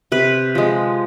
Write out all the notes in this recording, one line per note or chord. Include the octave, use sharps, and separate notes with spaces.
C3 B4
F3 G#3